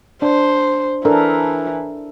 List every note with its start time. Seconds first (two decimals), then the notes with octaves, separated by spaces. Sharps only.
0.22 D4 C5
1.05 E3 D4 A4 A#4